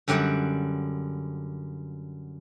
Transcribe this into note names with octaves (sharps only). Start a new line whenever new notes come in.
F#2 D3 G3 D5 F#5 G5